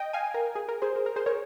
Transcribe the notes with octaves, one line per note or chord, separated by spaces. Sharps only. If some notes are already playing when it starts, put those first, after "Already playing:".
Already playing: D#5 G5
F5 G#5
A#4
G#4
A#4
G#4 C5
A#4
A#4
G#4 C5
A#4 C#5